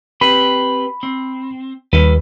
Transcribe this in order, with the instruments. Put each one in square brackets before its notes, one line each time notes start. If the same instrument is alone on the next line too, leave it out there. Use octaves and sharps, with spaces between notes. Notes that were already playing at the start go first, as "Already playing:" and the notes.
[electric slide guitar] C4 G4 B4 [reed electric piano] B5
[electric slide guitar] C4
[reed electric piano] D#2 [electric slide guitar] G3 A4 B4